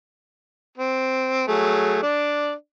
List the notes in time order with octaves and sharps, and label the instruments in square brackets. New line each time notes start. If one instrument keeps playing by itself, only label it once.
[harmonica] C4
F#3 A3 G#4
D4 D5